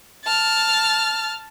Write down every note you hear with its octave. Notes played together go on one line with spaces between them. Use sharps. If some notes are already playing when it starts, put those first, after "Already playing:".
A5 F6